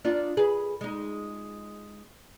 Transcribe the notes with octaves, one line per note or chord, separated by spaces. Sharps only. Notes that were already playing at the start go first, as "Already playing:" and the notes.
D4 D#4 F4
G#4 B4
G#3 D#4